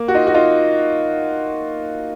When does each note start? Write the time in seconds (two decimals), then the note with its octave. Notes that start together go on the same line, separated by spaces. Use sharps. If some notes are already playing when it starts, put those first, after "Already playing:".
Already playing: A#3
0.08 F#4
0.14 D#4 F4
0.27 F#4
0.34 D#4 F4